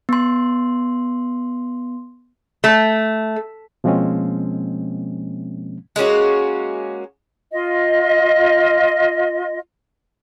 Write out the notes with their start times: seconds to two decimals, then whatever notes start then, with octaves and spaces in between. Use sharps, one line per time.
0.09 B3 C6
2.64 A3
3.84 B2 F3 G#3 A#3 C4 C#4
5.96 G#3 A#3 C#4 F#4
7.52 F4 D#5